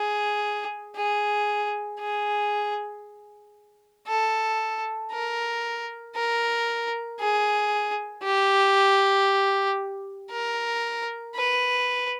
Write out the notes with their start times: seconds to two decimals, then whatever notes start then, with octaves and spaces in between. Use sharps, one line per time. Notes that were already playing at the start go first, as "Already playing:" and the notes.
Already playing: G#4
0.96 G#4
2.00 G#4
4.08 A4
5.12 A#4
6.16 A#4
7.20 G#4
8.23 G4
10.32 A#4
11.35 B4